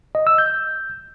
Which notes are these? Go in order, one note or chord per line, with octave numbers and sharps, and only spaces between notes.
D#5
E6
G6